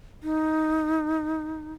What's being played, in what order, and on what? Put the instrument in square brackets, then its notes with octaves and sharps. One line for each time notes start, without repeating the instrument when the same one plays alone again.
[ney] D#4